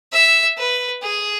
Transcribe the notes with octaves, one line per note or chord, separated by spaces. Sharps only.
E5
B4
G#4